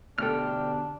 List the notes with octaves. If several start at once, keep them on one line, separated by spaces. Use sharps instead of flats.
B2 D3 A3 D4 G4 A4 G5 F6